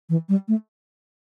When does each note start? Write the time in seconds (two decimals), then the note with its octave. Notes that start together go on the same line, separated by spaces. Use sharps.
0.10 E3
0.29 G3
0.48 A3